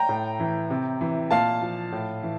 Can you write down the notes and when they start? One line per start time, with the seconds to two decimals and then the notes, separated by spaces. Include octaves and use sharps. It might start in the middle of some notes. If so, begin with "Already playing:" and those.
Already playing: G5 A#5
0.09 A2
0.40 E3
0.70 C3
1.01 E3
1.31 A#2 F5 A5
1.62 F3
1.92 A2
2.23 E3